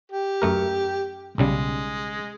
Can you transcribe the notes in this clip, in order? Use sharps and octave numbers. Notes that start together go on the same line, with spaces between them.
G4
F#2 A3 A#4
B1 C#3 G3 G#3